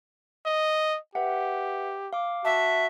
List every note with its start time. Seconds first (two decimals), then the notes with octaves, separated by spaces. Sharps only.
0.46 D#5
1.15 G4 B4 E5 F#5
2.13 F5 D6
2.45 F#4 E5 A5